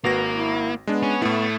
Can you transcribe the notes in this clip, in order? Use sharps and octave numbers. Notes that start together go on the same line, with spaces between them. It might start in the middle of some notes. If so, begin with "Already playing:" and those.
G#1 A#3 F#4 B4 A#6
E4
G#3 B3 D4
C#4
A2 A3 E4